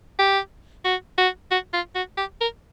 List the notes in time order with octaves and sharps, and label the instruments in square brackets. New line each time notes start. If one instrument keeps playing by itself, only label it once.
[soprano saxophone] G4
F#4
F#4
F#4
F4
F#4
G4
A#4